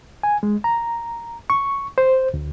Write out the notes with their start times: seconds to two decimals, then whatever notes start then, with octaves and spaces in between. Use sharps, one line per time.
0.23 G#5
0.43 G#3
0.64 A#5
1.50 C#6
1.98 C5
2.34 D2